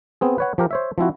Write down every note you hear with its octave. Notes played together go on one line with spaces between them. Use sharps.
B3 C4 G#4
B4 C#5 F#5
F3 G4 A#4
C5 C#5 E5
F3 C4 E4 F#4